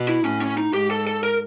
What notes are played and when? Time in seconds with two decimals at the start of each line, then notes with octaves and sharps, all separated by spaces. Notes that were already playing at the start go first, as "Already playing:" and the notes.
Already playing: B2
0.08 E4
0.25 A2 C#4
0.42 C#4
0.58 D#4
0.74 G#2 G4
0.91 A4
1.07 A4
1.23 A#4